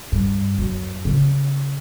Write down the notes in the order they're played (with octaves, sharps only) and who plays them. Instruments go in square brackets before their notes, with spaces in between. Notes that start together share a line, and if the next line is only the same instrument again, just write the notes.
[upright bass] G2
F#2
C#3